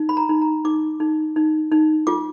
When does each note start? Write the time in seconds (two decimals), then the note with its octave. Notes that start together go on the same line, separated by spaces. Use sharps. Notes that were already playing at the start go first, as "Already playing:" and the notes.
Already playing: D#4
0.09 B5
0.17 A#5
0.29 D#4
0.42 A#5
0.65 D#4 D6
1.00 D#4
1.36 D#4
1.72 D#4
2.07 F4 D6